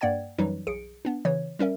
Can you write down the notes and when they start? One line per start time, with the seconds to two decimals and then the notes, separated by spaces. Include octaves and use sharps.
0.01 G2 A#3 D5 F#5 G5 G#6
0.38 F#2 E3 F#3 G3 D#4
0.67 B1 G#4 C#7 D7
1.05 B3 D4
1.25 C#3 E3 C#5
1.59 G3 C#4 A#4 E5